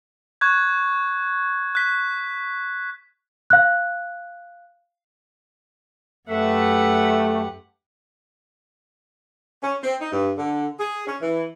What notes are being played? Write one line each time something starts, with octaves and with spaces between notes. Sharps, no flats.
C#6 F#6 G#6
F#6 B6
F5 F#6
F#2 A3 G4 B4 E5 F#5
C#4
C4
D#4
G2
D3
G#4
C#4
E3